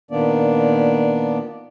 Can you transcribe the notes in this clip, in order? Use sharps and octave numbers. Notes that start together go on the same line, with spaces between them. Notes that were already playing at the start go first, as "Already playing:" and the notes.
A#2 D#3 A#3 B3 D4 D5